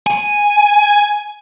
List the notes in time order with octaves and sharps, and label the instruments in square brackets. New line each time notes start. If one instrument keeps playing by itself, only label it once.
[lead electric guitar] G#5